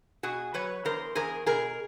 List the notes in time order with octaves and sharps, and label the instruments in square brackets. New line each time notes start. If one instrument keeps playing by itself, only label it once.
[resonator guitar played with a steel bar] B2 F#4 G#4
F#3 B4 C#5
E2 A#4 C5
E2 G#4 A#4
B2 G#4 A#4